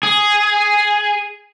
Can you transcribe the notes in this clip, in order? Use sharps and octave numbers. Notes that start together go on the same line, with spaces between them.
G#4